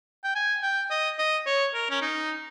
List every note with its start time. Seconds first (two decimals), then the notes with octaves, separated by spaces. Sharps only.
0.24 G5
0.35 G#5
0.63 G5
0.91 D#5
1.18 D#5
1.46 C#5
1.74 A#4
1.90 C#4
2.02 D#4